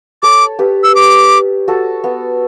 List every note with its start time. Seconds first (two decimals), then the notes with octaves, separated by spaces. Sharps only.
0.23 A4 C#5 D6
0.59 G4 B4
0.83 E6
0.95 D6
1.68 F#4 A4
2.04 B3